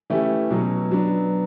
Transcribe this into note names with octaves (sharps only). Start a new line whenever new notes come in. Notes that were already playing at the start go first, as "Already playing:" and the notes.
E3 A3 C#4 E4 G4
B2 F#3 C#4
F#3 B3 D4